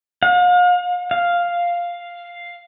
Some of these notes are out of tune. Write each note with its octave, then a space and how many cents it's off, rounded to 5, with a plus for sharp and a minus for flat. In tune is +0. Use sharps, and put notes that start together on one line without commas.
F5 +40
F5 +0